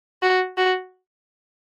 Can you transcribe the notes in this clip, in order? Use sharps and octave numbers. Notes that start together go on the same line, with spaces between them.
F#4
F#4